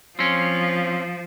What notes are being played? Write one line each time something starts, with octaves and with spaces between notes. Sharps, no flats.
F3 C4 C#4